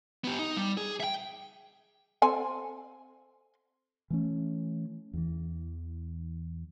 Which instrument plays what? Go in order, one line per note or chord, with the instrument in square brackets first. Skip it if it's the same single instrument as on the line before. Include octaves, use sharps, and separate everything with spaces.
[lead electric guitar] B3 G4
D#4
G3
G#4
E5 G5
[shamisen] C4 A4 G#5
[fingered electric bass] E3 A3 C#4
E2 E3